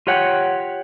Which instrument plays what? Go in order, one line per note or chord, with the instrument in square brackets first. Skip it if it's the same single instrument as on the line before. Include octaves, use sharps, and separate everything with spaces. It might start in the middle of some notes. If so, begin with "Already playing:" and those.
[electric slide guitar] F4 G4 C#5 F#5 G5